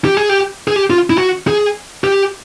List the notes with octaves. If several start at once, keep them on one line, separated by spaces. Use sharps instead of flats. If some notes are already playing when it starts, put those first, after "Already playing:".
G4
G#4
G4
G#4
G4
F4
E4
F#4
G#4
G4